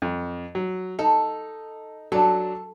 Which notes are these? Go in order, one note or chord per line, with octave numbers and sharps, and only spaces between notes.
F2
F#3
D#4 A4
F#3 D4 F#4 A4